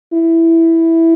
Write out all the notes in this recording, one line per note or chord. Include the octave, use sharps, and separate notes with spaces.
E4